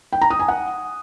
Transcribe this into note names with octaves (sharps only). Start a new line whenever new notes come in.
G5
A#5
D#6
G#5
F#5